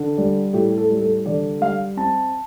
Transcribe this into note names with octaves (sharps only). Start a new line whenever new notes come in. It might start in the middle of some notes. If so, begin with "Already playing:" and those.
Already playing: D3
G3
A2 G4
A4
G3
A4
D3 D5
G3 F5
C4 A5